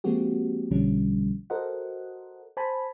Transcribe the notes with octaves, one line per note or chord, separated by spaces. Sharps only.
F3 G#3 A#3 C4 F#4 G4
B1 B2 D3 F3 G3 C#4
F#4 A4 A#4 C5 D#5 F#5
C5 G#5 A5 B5